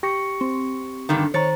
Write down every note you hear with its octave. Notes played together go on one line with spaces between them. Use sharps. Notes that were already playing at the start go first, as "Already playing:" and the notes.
G4 C#6 A#6 C#7
C4
G2 D3 D#3
D#3 C5 C#5 A#5 A6